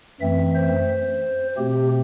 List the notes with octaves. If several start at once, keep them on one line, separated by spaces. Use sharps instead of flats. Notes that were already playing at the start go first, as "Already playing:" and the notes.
F#2 E3 A3 C4 E5
C5
B2 A3 C4 G4